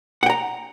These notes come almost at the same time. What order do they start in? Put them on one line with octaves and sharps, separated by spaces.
F#5 G5 A#5